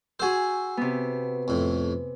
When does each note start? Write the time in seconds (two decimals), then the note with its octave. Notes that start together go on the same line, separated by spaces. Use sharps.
0.20 F#4 G#4 C5 E6
0.77 C3 B3
1.48 F2 A2